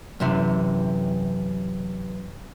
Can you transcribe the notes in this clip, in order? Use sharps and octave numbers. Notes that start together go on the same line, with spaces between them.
F#2 C3 E3